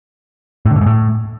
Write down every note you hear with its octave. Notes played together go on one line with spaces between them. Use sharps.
A2
D3
A2
G#2
A2